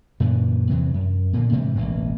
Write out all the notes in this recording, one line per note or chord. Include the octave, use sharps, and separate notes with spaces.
F#2 A#2 D3 E3
E2 C3 E3 F#3
F#2
A#2 D3 A#3
G#2 C3 E3 G3
E1 A1 E3 A#3